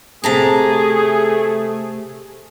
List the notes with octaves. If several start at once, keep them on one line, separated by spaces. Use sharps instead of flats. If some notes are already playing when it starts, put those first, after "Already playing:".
C3 A3 G#4 A5 A#5